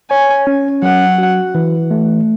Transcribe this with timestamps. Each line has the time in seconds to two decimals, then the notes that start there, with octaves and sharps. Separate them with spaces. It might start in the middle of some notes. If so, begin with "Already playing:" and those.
0.10 C#5 G#5
0.47 C#4
0.82 F#3 F#5
1.18 F#4
1.55 E3
1.91 A3